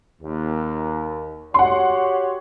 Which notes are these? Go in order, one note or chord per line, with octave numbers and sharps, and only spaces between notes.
D#2
F#4 G4 C#5 F#5 C6